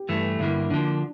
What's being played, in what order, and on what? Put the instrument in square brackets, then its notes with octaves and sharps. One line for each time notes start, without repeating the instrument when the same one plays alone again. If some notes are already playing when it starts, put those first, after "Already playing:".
Already playing: [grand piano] G4
[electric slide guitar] G2 E3 A3
[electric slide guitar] G2 D3 G3 A#3 [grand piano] E4
[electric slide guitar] D3 F3 A#3 [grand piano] D4